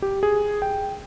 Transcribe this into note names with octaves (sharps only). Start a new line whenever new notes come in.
G4
G#4
G5